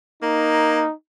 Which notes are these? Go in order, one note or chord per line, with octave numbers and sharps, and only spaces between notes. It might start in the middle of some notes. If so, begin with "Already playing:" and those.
A#3 D#4